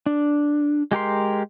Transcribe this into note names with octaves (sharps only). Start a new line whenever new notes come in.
D4
G#3 G4 A#4 C6